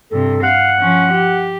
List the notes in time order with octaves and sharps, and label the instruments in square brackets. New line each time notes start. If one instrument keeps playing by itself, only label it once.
[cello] G2 C3 [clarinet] A4
[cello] F5 [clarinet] F#5
[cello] F3 C#4
G4